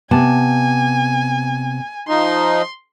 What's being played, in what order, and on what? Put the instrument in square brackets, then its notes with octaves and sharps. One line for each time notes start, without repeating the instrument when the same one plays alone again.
[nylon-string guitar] C3 B3 A5 [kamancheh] G#5
[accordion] F3 D#4 [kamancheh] C6